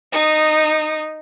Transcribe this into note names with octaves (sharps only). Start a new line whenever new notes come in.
D#4 D#6